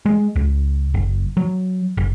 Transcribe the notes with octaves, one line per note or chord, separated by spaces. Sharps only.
G#3
C#2
F#1
F#3
F#1